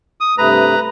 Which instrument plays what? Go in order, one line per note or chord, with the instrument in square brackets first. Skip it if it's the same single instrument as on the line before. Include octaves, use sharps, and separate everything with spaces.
[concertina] D#6
[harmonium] G2 C3 A3 [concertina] B4 A#5